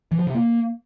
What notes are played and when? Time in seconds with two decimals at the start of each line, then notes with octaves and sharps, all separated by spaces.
0.12 E3
0.19 F3
0.27 C3
0.35 A#3